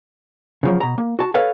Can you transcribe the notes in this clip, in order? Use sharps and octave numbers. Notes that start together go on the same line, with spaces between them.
C#3 F3 F#3
B2 A#5
A#3
F#4 A5
A4 B4 C#5 F5